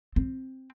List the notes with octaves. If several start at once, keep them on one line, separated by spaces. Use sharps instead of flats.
C4